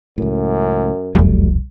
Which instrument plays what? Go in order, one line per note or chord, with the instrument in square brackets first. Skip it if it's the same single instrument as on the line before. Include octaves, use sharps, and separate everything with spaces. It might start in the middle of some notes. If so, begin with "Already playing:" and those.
[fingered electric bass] C#2 A2 [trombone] F#2
[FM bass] E1 [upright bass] C2 F2 [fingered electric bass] F#3 G3 A3